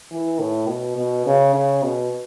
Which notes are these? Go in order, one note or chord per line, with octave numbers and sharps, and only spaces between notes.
E3
A2
B2
B2
C#3
C#3
B2